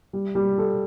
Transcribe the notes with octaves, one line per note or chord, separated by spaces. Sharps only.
G3
G3
A4